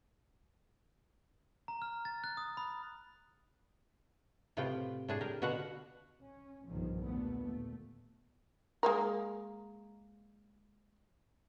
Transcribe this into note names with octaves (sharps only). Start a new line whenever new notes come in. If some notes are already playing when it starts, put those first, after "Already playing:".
A#5
F6
A6
F#6
D#6
B5
A2 C3 F4 B4 G5
A2 D4 G#4
G4 A#4
B2 D3 F#4 F5 F#5
C#4
B1 G2 A#2 D3 D#3 F3
D#2 A#2 D3 A3 B3
A#2 A3
G#3 A#3 A#4